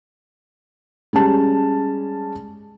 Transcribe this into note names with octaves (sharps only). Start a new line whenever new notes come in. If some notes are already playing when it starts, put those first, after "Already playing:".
G3 G#3 C#4 A5